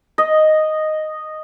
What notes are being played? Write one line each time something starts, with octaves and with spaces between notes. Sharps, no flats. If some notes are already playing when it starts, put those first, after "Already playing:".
D#5